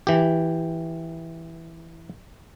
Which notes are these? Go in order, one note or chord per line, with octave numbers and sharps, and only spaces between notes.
E3 G4